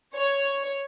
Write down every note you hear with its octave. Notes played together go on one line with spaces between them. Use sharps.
C#5